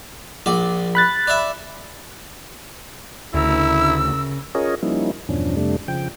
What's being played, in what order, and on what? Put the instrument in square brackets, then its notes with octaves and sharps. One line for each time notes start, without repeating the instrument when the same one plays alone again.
[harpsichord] A#1 D5
[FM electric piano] B5 F#6 A6
[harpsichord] D5 E5
[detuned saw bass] D2 [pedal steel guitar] C#3 A#4 [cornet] E4 [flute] E6
[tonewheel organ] C#4 F4 G#4 A#4 C#5 D#5
F3 G3 A#3 C#4 D#4 E4
E2 G2 B2 F3 C#4 D4
F2 C3 G3 A3 D4
C#3 F3 G5